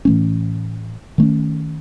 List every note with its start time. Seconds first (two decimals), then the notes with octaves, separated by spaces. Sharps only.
0.05 A2 E3 A3 C#4
1.18 D#3 A3 C#4